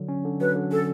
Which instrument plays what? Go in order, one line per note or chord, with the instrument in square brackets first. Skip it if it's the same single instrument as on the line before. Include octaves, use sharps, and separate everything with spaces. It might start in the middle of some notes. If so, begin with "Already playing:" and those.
Already playing: [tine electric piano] D3 F#3
C#4
D3
[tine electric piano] F#3 [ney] B4
[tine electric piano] D3
[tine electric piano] C#4 [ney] A4